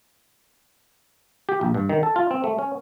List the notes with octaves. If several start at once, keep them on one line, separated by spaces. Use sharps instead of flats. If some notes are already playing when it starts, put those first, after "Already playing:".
G4
A#1
G2
D#3
A4
F4
C4
A3
C#4